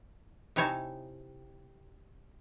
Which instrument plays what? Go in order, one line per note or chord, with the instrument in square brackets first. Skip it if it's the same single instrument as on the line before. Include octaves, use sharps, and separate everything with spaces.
[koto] C3 D#4 E4 C#5 G#5 A5